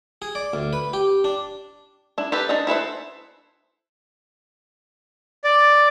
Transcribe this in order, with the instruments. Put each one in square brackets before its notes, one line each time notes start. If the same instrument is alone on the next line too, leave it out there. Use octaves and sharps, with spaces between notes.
[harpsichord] G#4
D5
D2
B4
G4
D4
[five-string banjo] D4 E4
G4 A4 B4
D4 D#4 D#5
E4 A4 B4 C5
[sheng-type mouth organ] D5